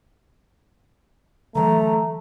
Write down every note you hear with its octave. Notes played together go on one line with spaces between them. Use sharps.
D3 E3 F#3 A3 A#5